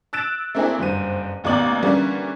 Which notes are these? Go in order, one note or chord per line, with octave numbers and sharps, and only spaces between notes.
E6 F#6 A6 D7 E7
A3 A#3 C4 D4 E4 G#4
F#1 G2 C5 D#7
A1 D#2 B2 D5 F#7
D3 E3 G3 A#3 C#4